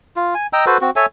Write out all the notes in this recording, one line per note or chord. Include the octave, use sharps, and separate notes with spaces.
F4
G#5
D#5 G5 A#5 E6
F#4 A4 B4 C5
C4 F#4
A4 C#5 E5 G#5